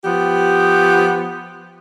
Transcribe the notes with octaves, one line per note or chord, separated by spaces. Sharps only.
F3 B3 G4